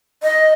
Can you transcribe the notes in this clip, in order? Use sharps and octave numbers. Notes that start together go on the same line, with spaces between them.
D#5